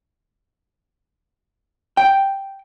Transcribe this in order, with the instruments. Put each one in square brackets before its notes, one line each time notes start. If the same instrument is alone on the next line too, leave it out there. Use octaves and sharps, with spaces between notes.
[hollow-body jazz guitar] G5